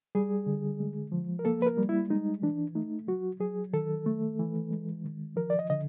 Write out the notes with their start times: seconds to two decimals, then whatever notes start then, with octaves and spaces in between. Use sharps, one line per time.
0.15 G3 G#4
0.46 D3
0.80 G#3
1.12 F3
1.39 A#4
1.45 A#3 A4
1.62 B4
1.67 A#4
1.77 G3
1.89 E4
2.10 G#3 D#4
2.42 E3 D4
2.75 A3 D#4
3.07 F#3 F#4
3.40 F#3 G#4
3.73 D#3 A4
4.06 A3
4.39 E3
4.71 G#3
5.04 D#3
5.36 F3 A#4
5.50 D5
5.59 D#5
5.70 D3 D#5